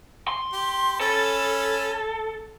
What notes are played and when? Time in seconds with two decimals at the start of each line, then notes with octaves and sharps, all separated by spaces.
0.28 C6
0.53 G4
1.01 C#4 A4 B5